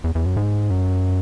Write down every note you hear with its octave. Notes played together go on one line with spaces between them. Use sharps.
E2
E2
F#2
G#2
F#2